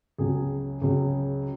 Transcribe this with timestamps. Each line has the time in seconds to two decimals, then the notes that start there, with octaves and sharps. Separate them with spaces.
0.18 C#2 C#3 F#3 G#4
0.82 C#2 C#3 F#3